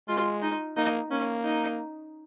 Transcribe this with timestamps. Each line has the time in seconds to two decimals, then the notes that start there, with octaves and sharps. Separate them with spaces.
0.08 G#3 F4
0.43 D#4
0.77 A#3 D#4
1.11 A#3 C#4
1.45 D#4